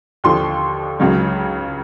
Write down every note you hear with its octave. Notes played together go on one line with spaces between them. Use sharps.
D#2 D3 F3 C6
C#2 C#3 F#3